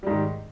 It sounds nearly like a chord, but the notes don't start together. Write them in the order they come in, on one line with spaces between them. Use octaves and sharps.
G3 G#2 D#3